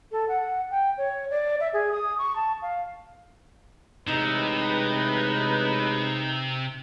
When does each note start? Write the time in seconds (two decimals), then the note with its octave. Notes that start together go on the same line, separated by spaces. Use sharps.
0.12 A4
0.28 F#5
0.71 G5
0.98 C#5
1.30 D5
1.60 E5
1.74 G#4
1.92 D#6
2.18 C#6
2.36 A5
2.62 F5
4.07 A1 C3 G#3 D#4 B4